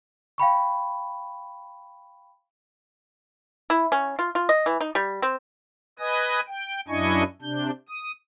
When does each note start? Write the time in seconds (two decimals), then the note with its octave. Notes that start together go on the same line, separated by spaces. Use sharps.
0.38 F5 G5 B5 C#6
3.70 E4
3.92 C#4
4.19 F4
4.35 F4
4.49 D#5
4.66 E3
4.81 D#4
4.95 G3
5.22 C4
5.99 B4 D#5 G#5 D#6
6.47 G5
6.88 F#2 D4 E4 D#5 G#5 C#6
7.42 C3 D4 G6
7.89 D#6